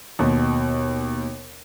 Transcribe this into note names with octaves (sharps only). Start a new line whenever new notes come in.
D#2 B2